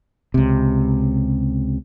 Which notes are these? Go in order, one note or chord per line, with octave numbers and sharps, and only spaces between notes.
C#2 C3